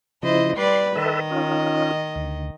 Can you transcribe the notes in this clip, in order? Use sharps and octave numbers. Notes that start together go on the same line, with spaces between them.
C#3 F3 E4 C5 D#5
G3 B4 D5 C6
D#3 A4 B4 D#5 E5
C#4 D#4 F4
D2